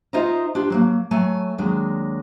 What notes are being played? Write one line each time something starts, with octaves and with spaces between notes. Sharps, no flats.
D#4 F4 C5 D#5 E5 A#5
D4 F4 G4 C5
F#3 G#3 A#3
F#3 A3 G#5 A5
D#2 F#3 G#3 D4